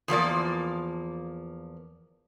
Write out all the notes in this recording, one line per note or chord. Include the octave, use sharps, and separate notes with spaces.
E2 F3 A#3 D5